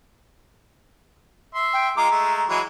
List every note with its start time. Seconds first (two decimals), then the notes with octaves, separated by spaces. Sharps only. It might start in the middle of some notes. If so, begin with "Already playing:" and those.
1.55 E5 C6
1.73 G5
1.97 G#3 F4 A#5 D6
2.11 G#3 A3
2.49 E3 F#3 G#3